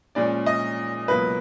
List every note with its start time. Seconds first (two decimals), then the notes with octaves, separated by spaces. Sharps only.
0.15 A#2 F3 G#3 C#4 D5
0.46 D#5
1.08 C#2 B2 F#3 A#3 B4